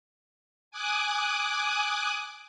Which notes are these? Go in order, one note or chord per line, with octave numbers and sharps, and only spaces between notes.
G#5 D6 D#6 F#6